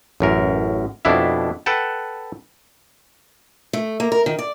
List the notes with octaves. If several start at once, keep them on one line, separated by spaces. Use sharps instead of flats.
A1 F#2 A#4
F2 B2 D4 E4 E5
A4 B4 F#5 G5 A5
A3
A#3
A#4
D#3
D5